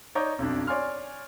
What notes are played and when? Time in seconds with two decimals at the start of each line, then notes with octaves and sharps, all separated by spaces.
0.15 D#4 C#5 D5 A#5 D6 G6
0.39 B1 F2 D4
0.67 C#5 D5 G#5 C6 F6